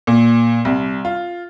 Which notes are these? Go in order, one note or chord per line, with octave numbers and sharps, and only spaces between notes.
A#2
C2
F4